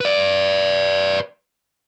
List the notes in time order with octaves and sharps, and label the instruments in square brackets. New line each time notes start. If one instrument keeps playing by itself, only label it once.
[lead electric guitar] B4 D5